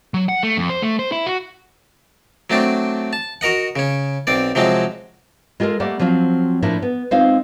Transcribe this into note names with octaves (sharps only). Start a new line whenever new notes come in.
F#3
F#5
A3
F2
C5
A3
C5
E4
F#4
F#3 A3 C4 D4
A5
F#4 A#4 D#5 F#5
C#3 C#4
B1 C4 D5
C3 F3 F#3 G#3 C4
G#3 F4 G4 A4 A#4
G3 A3 A#3 D5 F#5
F3 F#3 C4 F4
A2 F3 A#3 D4 E4
B3
G#3 C4 D#4 F4 C5 F5